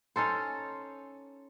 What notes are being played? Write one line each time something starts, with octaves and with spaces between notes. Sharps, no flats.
C#4 D#4 A4 C5